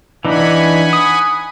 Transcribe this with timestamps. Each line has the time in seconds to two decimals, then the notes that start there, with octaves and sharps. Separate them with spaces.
0.25 E3 D4 D#4 F#5 G#5 B5
0.93 D#6